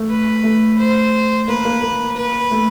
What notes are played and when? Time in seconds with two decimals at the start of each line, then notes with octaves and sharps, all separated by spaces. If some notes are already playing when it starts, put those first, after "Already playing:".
Already playing: A3
0.10 B4
0.43 A3
0.78 C5
1.48 A#3 B4
1.65 A#3
1.82 A#3
2.17 B4
2.51 A3